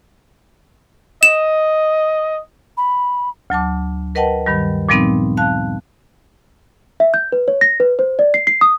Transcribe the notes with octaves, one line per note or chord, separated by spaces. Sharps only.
D#5 E7
B5
D2 F#3 A5 D6
A#4 B4 D#5 F#5 G5 A5
G2 D#3 G3
A#2 F3 G3 B3 C4 D#4
F5 A5 F#6
E5
G6
B4
C#5
A#6
B4
C5
D5
C7
C7
D#6